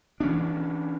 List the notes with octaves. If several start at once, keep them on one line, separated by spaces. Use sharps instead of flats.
E3 C#4 D4